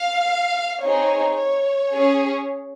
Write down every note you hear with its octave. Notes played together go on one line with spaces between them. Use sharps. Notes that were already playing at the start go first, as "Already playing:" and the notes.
Already playing: F5
C4 D#4 G#4 C#5
C#5
C#4 G#4